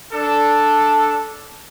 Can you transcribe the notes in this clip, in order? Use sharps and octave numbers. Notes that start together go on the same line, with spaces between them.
D4 A4